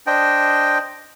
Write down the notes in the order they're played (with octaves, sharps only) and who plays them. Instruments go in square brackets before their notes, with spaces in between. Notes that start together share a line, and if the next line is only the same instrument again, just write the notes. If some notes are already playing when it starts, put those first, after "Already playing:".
[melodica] D4 C5 D#5 G5